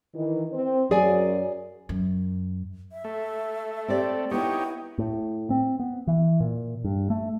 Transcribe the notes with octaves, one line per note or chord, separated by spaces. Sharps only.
D#3 E3
C4
F#2 G#4 D5 G#5
F#2
E5
A3
C4 G4 D5
B3 D#4 E4 G4 C#5 G5
A2
C4
B3
E3
A#2
G2
A3